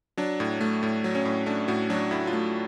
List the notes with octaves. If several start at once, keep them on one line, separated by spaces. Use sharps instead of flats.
F#3 D4
A2
A3
A2
F#3
C#4
A2
A3 D4
A2 F#4
F#3 D4
A2 E4
F4
A3